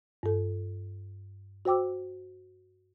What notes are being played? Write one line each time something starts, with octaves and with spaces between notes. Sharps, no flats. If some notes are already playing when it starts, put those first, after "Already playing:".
G2 A4
F#4 C5 G5 D6 E6